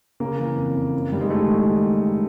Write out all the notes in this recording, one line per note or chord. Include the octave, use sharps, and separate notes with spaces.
C#3 A#3
E3
F2
F2
F#2
D#3 G3
G#3
D#3 A3